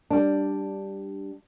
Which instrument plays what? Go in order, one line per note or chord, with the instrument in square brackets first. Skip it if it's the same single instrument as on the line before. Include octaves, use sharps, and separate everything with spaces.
[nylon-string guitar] G3 D4